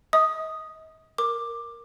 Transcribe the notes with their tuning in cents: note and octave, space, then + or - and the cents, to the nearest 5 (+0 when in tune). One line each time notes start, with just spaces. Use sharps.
D#5 +40 D#6 +0
A#4 +0 D6 +10